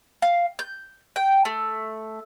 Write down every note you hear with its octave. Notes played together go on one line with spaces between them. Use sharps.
F5
G6
G5
A3